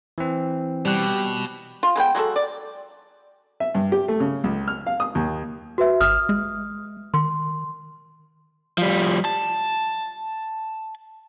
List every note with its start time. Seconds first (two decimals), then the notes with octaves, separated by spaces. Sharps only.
0.18 E3 C4
0.85 B2 G3 G4 F#6
1.83 F4
1.96 G#3 B3 C5 G5
2.15 F#3 G#3 F#4 A4
2.36 D5
3.60 E5
3.75 G2
3.92 G4
4.08 A3
4.20 C#3
4.44 C#2
4.68 F6
4.87 F5
5.00 D#6
5.15 D#2
5.78 F#4 B4 E5
6.01 G#1 D#6 F6
6.29 G#3
7.14 D#3 C6
8.78 F3 G3
9.25 A5